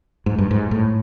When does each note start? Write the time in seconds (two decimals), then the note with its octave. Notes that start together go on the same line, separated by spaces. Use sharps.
0.26 G#2
0.38 G2
0.51 G#2
0.71 A2